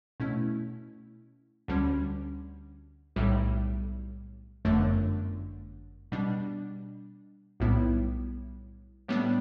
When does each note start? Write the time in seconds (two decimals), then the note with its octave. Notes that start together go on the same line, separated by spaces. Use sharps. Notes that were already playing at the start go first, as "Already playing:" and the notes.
0.20 B2 A3 C#4 E4
1.68 D2 D3 G3 C#4
3.16 B1 A2 G3
4.65 G1 F#2 D3 A3 D4
6.12 B2 G3 D4
7.60 B1 A2 G3 B3 E4
9.08 A2 G3 B3 D4